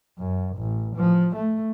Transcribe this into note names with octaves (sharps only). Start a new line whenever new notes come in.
F#2
A1
F3
A3